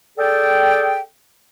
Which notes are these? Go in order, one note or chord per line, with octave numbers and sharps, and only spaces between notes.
G#4 A4 D5 G5